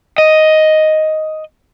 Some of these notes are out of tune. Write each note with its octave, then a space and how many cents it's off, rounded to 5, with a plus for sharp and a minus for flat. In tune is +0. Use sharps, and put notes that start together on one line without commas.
D#5 +5